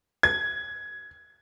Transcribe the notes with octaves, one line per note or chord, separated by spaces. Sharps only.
G#6